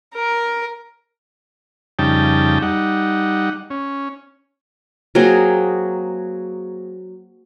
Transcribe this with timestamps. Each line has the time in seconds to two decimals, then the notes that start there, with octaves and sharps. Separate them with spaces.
0.15 A#4
1.99 F2 C#3 G3 D#4 G5 A5
2.62 G3 D#4 F#5
3.70 C#4
5.15 F#3 A#3 C4 G#4